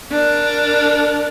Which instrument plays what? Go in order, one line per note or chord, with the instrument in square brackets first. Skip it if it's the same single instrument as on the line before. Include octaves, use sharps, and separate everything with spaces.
[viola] D4 A#4